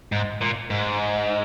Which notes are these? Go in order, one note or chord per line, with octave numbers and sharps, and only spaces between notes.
G#2
A#2
G#2